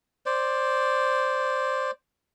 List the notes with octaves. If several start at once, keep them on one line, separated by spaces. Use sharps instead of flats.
C5 D5